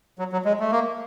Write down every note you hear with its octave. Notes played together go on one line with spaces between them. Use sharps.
F#3
F#3
G#3
A3
A#3